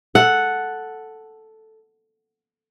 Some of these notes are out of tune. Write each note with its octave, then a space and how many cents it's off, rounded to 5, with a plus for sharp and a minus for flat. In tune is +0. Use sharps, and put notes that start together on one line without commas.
A4 +0 F#5 +0